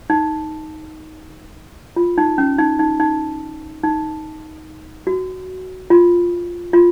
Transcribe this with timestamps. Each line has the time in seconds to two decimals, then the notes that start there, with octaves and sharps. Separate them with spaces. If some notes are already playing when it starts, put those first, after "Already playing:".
0.10 D#4
1.96 F4
2.18 D#4
2.38 C#4
2.59 D#4
2.79 D#4
3.00 D#4
3.84 D#4
5.07 F#4
5.90 F4
6.73 F4